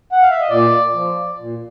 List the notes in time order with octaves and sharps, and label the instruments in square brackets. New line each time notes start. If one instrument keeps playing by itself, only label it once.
[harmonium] F#5
F5
E5
D#5
A#2 D5
F3
A#2